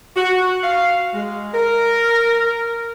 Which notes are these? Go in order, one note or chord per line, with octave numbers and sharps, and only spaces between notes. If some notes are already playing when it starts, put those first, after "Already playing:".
F#4
F5
G#3
A#4